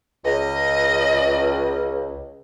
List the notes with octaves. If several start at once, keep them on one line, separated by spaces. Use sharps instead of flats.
C#2 D#5